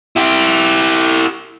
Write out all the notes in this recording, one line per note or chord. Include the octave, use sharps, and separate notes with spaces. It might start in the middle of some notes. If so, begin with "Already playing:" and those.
E4 G4